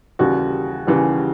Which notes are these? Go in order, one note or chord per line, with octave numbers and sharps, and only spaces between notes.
D#2 C#3 E3 G3 F#4
D#2 C#3 E3 G3